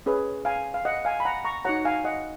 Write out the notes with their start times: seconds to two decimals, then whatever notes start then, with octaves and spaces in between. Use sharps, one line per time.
0.06 C#4 G#4 B4
0.45 F5 G#5
0.74 F5
0.85 D#5 F#5
1.05 F5 G#5
1.20 B5
1.25 F#5 A#5
1.45 A#5 C#6
1.65 D#4 F#4 C#5 F#5 A#5
1.85 F5 G#5
2.04 D#5 F#5